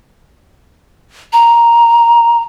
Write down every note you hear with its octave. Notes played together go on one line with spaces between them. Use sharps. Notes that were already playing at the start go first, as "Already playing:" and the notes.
A#5